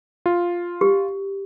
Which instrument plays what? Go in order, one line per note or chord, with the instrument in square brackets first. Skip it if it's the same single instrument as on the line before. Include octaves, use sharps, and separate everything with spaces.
[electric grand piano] F4
[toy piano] G4